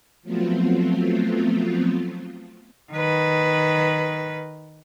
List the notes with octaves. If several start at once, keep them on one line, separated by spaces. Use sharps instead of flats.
F3 F#3 A3 B3 C4 F4
D#3 B4